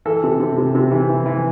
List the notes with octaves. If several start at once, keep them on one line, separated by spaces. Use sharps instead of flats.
E3 A4
C3
C3
C3
C3
E3
E3
E3